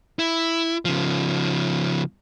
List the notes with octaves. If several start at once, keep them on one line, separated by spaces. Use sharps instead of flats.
E4
C#3 F3